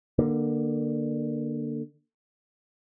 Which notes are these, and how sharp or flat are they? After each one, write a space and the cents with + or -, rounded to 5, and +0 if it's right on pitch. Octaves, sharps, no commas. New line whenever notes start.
D3 +25 A#3 +15